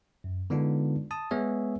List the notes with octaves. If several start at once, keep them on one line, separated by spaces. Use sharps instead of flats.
F#2
D3 G#3 B3 D4 D#4 F4
A5 D#6
G#3 B3 G#4 C#5 E5